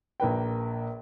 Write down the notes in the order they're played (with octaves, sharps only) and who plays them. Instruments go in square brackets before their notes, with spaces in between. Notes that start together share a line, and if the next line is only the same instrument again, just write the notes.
[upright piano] A#1 A#3 B4 G5